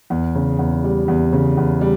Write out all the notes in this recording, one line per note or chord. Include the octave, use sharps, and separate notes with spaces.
E2
C#3
E2
G3
E2
C#3
E2
G3